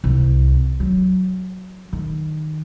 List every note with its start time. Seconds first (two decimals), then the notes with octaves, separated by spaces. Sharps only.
0.04 C2
0.80 F#3
1.93 D#3